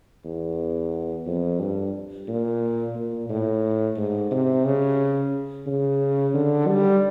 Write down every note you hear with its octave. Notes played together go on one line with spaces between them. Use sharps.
E2
F2
G2
A#2
A#2
A2
G#2
C3
C#3
C#3
D3
G3